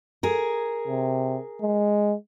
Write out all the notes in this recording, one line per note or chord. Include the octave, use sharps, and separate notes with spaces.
G#4 A#4
C3
G#3